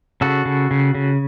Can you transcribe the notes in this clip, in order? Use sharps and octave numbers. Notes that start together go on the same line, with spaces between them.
C#3 F#4 A4
C#3
C#3
C#3